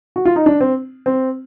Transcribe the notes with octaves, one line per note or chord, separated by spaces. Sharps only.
F#4
F4
D#4
D4
C4
C4